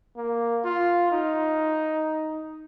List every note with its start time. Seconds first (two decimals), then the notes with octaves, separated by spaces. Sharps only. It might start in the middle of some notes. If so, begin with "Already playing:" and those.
0.16 A#3
0.64 F4
1.11 D#4